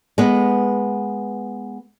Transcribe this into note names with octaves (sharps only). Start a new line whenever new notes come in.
G#3 B3